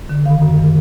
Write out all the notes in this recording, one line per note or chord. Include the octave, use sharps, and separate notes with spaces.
D3
D#3 F5
F#2
D#3